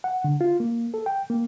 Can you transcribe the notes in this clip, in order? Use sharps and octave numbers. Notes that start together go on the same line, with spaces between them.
F#5
D3
F4
A#3
A4
G5
A#3